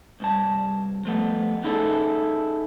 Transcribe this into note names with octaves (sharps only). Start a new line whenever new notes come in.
C2 G2 A5
F3 A3 B3
D3 D#4 E4 G#4 A4